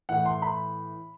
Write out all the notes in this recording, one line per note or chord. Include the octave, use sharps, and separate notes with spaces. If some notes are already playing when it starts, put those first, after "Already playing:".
A2 E3 F#5
C6
B5